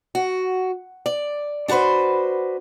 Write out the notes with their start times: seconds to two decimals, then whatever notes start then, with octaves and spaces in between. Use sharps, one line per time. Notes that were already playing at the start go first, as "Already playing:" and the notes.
0.15 F#4
1.06 D5
1.68 D4 F#4 G4 B4 C5